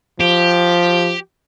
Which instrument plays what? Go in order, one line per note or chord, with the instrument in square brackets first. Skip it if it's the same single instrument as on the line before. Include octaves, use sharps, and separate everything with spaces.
[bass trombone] F3 [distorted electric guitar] G4